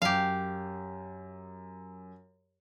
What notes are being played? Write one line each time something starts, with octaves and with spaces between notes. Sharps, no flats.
F#2 G4 F5